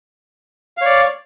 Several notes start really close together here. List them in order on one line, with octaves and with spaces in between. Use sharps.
F5 C#5 D5